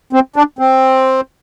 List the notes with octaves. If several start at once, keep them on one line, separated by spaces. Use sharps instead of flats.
C4
D4
C4